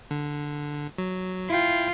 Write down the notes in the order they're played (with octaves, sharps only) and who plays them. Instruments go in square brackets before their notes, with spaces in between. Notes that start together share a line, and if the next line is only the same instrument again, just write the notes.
[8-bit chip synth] D3
F#3
[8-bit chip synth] E4 G5 [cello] F4